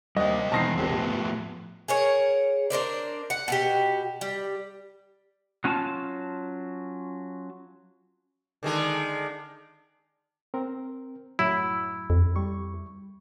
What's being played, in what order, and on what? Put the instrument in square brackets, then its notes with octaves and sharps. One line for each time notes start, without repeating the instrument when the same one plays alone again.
[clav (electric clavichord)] D#2 D4 G5 [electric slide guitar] G3 C5 [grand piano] D#5
[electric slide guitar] B2 E3 [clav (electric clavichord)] D#3 C4 [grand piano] A5 A#6 C7
[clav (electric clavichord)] A#1 G#3 [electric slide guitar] E2 C4 G4
[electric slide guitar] A2 F3 B3 [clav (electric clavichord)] G4
[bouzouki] G#4 A#4 C#5
D4 A#4 C5 D5
F#5
B2 F#4 G4
G3
[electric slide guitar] F#3 C#4 F4 G#5 A5
[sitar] D3 D#3 G#3
[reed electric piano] C4 A#4
[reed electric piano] F#2 A2 F#3 [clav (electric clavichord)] E4
[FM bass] F2
[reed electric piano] G3 C#6